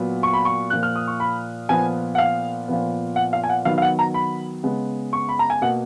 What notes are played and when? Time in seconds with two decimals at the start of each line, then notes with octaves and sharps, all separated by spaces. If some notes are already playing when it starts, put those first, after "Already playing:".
Already playing: A#2 F#3 B3
0.23 C#6
0.33 B5
0.45 C#6
0.70 A#2 F3 A#3 F#6
0.83 F6
0.96 D#6
1.08 C#6
1.20 B5
1.69 A#2 F3 B3 G#5
2.15 F#5
2.18 F5
2.68 A#2 F3 B3
3.16 F#5
3.33 F5
3.44 G#5
3.49 F#5
3.65 D#3 F#3 B3 F5
3.78 F5
3.82 F#5
3.99 A#5
4.14 B5
4.63 C#3 G#3 B3
5.13 C#6
5.29 B5
5.39 A#5
5.50 G#5
5.62 B2 A#3 F#5